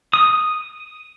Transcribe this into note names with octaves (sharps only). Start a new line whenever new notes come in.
D#6